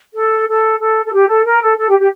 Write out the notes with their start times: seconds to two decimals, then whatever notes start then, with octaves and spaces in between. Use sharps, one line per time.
0.14 A4
0.48 A4
0.79 A4
1.05 A4
1.13 G4
1.29 A4
1.45 A#4
1.61 A4
1.78 A4
1.89 G4
1.99 G4